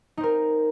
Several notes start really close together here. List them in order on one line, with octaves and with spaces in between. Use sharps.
D#4 C4 A#4